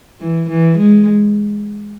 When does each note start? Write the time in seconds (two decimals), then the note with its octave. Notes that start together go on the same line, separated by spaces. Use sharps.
0.21 E3
0.49 E3
0.78 G#3